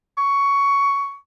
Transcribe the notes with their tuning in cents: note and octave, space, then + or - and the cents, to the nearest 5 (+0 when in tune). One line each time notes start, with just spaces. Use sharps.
C#6 +15